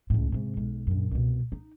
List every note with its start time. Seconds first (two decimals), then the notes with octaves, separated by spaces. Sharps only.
0.10 C#2 A2
0.32 G#2 C3
0.57 B1 G#3
0.87 A#1 F#2
1.11 C2 B2
1.52 D#4